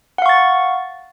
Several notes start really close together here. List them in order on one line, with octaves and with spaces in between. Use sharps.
F#5 F5 C#6 A6